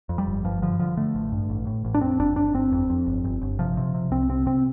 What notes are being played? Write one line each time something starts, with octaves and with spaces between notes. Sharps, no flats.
F2
G3
G1
G2 F3
D3 F3
D3 F3
D3 A3
A1
G2
A1
A2
A1
D4
F2 C4
G1 D4
G1 D4
G1 C4
F2
F2
G1
G1
G1
C3 F3
C3
C3
C2 C4
C3 C4
C3 C4